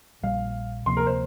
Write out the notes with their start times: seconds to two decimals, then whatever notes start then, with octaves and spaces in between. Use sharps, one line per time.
0.23 A#1 A#2 G3 F5
0.86 D2 C3 F3 A#3 C6
0.97 A#4
1.07 C5